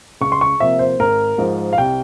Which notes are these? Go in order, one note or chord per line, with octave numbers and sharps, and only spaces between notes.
C#2 C#6
C6
C#6
C3 F3 A#3 E5
C5
G#1 A#4
G#2 F3 G#3
F5
C2 G5